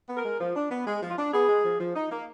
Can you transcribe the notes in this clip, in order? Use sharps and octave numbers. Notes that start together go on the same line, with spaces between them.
B3
A#4
G#3
F3
D4
B3
G#3 G#4
F3
F4
D4
B3 G#4
G#3
F3
F3
D#4
A#3